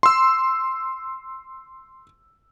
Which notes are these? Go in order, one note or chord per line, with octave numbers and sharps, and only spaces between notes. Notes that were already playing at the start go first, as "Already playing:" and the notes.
C6 E6